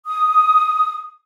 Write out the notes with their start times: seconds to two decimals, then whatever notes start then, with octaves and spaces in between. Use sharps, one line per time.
0.07 D#6